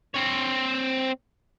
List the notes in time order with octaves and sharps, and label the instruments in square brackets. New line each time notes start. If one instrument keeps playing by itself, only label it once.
[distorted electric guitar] C4 C#5